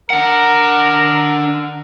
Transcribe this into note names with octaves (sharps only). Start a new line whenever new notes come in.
D4 A#4 F#5